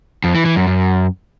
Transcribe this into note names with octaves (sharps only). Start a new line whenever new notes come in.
F2
E3
E3
F#2
F#2